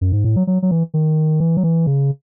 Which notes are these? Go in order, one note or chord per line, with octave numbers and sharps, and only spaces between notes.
F#2
G#2
A2
F#3
F#3
F#3
E3
D#3
E3
F#3
E3
C#3